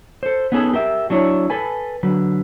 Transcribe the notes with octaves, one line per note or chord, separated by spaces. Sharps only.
A4 C5
B3 C#4 D#4 G#4 A4 B4
G4 A#4 E5
F#3 D4 E4 C#5
A4 B4 G#5
D3 F#3 B4